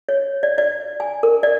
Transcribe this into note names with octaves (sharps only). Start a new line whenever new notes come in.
C#5
D5
D5
G#5
A#4
D5